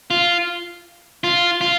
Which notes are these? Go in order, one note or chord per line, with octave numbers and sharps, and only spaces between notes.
F4
F4
F4